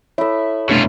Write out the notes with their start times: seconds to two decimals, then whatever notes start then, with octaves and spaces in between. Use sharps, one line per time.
0.18 E4 A4 C#5 E5
0.69 F1 G2 B2 F4